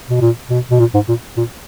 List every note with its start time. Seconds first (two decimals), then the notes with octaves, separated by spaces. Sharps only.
0.10 B2
0.21 A#2
0.50 B2
0.71 B2
0.80 A#2
0.94 G#2
1.09 A#2
1.37 A#2